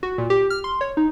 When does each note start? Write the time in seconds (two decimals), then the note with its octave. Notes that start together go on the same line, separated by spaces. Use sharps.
0.03 F#4
0.18 A#2
0.30 G4
0.50 F6
0.64 C6
0.81 C#5
0.97 D#4